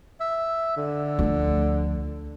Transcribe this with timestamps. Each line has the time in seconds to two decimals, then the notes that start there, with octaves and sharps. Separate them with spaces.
0.21 E5
0.77 D3
1.19 D2 F3